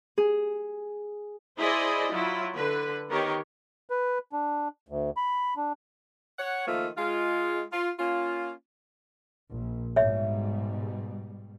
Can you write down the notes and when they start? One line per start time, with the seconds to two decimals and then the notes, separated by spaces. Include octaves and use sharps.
0.18 G#4
1.58 E4 G#4 C5 D5 D#5
2.11 F#3 E4 F4
2.54 D3 B4
3.10 D#3 B3 G4 A#4 C#5
3.90 B4
4.33 D4
4.89 D2
5.17 B5
5.57 D4
6.39 C#5 F#5
6.67 D#3 F3 A3 A#3 F4
6.97 G#3 F4
7.72 F4
7.99 A#3 C#4 F4
9.54 A#1
9.96 G#2 B2 G3 C#5 E5